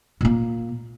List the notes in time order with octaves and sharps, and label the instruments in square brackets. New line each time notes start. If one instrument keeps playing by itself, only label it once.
[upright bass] A#2 A#3